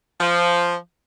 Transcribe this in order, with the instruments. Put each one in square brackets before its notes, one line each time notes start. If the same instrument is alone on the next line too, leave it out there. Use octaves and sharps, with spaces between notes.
[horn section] F3